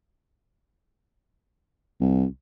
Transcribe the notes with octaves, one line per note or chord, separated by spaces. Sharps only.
C2